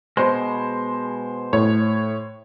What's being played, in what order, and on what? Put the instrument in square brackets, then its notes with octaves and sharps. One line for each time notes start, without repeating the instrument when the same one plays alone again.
[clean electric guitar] B2 G#3 [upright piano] C5
[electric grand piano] A2 [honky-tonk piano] C#5